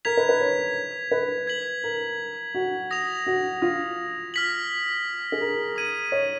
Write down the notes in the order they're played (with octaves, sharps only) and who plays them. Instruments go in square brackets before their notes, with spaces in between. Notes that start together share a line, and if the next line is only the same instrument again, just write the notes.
[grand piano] A#4 [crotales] G#6 B6 F7
[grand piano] B4
B4
C#5
B4
[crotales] G#6 B6 F#7
[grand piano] A#4
F#4
[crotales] D#6 A#6 F7
[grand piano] F#4
F4
[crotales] F6 B6 F#7
[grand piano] G#4
A#4
[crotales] D#6 G#6 D#7 F#7
[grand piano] C#5